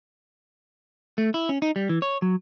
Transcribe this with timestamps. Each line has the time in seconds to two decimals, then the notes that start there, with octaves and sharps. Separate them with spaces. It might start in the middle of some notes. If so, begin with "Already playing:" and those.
1.18 A3
1.34 E4
1.49 C#4
1.62 D#4
1.76 G3
1.89 E3
2.02 C#5
2.22 F#3